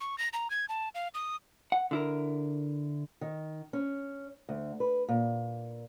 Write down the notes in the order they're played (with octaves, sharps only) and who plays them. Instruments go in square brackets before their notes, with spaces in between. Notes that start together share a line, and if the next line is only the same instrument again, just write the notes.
[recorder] C#6
A#6
A#5
G#6
A5
F5
D#6
[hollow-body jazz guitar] F#5
D3 E4 A#4
[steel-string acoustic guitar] D#3
C#4
D2
B4
A#2